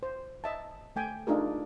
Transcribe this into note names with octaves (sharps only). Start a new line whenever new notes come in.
C5
D#5 E5 A5
A3 G5 G#5
A3 D4 D#4 F4 G#4 A#4